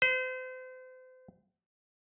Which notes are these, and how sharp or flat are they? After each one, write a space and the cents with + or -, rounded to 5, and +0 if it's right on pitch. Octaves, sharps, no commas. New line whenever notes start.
C5 -35